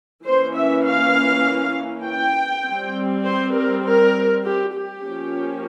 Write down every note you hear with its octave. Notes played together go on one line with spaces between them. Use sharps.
E3 A#3 C#4 C5
E5
F5
G5
G3 C4
C5
A#4
A#4
G4
G4
F3 A#3 C#4